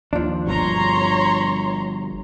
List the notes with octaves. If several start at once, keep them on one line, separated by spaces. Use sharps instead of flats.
D#2 F3 D4
G1 G2 B2 C#5 A#5 C6